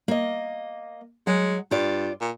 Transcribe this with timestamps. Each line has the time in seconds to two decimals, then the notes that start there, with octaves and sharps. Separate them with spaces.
0.08 A#3 D#5
1.27 F#3 G#3 F#5
1.71 G2 F4 D5
2.21 A#2